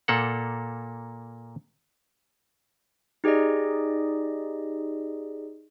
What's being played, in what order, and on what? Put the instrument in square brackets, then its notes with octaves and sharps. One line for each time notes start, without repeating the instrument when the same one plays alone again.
[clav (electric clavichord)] A#2 A#3 A4 F#5
[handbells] D#4 G4 G#4 D5 D#5